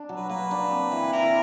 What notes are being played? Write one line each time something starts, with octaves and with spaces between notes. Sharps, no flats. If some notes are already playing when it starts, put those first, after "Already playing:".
Already playing: D4
F#3
B4
A#3 B4
D4
C4
E3
E3 A#4